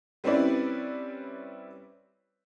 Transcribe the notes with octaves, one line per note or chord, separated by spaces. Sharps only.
G3 C4 C#4 E4 B4 D5